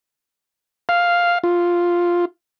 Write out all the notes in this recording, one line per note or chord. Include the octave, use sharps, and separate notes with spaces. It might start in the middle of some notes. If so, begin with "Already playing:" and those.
F5
F4